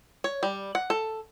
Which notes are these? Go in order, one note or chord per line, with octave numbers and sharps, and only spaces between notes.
C#5
G3
F#5
A4